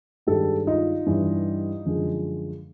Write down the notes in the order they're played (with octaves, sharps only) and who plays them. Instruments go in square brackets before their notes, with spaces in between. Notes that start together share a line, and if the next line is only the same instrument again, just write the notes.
[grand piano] G2 D#3 G#3 G4 A4
D#4 F4
G2 E3 G3
F#2 D3 F3 G#3